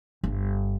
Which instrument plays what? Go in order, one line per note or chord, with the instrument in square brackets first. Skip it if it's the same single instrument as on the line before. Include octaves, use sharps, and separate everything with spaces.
[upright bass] G1